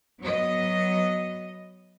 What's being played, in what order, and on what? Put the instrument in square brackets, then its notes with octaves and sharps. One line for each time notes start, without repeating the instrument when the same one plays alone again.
[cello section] F#3 B3 D#5